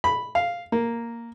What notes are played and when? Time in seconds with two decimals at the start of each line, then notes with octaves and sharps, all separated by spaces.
0.04 B5
0.35 F5
0.72 A#3